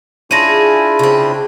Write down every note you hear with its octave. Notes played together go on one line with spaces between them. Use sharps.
C#4 D4 E4 F4 G#4 C6 A#6 D#7
C#3 C4